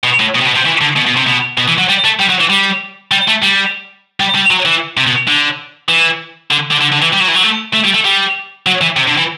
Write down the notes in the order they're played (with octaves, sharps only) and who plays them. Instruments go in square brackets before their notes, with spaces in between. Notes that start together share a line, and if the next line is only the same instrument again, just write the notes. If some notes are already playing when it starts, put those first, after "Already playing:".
[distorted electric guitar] B2
A2
B2
C3
B2
C3
E3
D3
B2
B2
C3
B2
B2
E3
F#3
G3
A3
G3
F#3
E3
G3
G3
A3
G3
G3
G3
F#3
E3
C3
B2
D3
E3
D3
D3
D3
D3
E3
G3
F#3
E3
F#3
A3
A3
G3
A3
G3
F#3
E3
C3
D3
E3